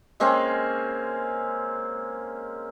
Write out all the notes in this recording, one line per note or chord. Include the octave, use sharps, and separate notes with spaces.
G#3 A#3 C4 C#4